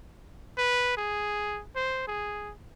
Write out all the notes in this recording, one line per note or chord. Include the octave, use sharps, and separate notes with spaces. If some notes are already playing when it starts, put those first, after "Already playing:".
B4
G#4
C5
G#4